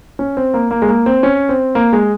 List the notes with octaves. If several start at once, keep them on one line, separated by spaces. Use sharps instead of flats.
C#4
C4
A#3
A#3
G#3
A#3
C4
C#4
C4
A#3
G#3